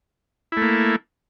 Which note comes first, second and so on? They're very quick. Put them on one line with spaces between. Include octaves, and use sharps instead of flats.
E4 A3 A#3